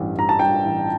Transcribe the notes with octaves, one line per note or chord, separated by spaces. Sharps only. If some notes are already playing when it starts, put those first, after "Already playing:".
Already playing: A1 G2
G2 A#5
A5
G2 G5
A1